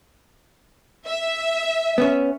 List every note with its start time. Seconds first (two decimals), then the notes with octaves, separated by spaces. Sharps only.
1.07 E5
1.98 B3 C#4